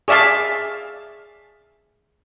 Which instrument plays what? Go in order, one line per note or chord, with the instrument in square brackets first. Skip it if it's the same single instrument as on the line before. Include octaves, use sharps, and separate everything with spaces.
[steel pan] G#4 D5 E5 F5 A5